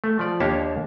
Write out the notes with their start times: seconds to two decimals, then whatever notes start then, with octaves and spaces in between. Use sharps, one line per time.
0.04 A3
0.19 F3 D5
0.40 D#2 A#3 D4 G4 C#5 A5